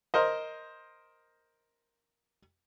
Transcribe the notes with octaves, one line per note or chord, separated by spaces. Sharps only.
A#4 C5 D#5